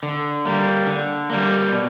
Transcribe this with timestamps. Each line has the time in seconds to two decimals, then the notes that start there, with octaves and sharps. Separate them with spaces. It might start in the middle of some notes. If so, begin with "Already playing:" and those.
0.03 D3
0.45 G3 A#3
0.87 D3
1.30 G3 A#3
1.72 B2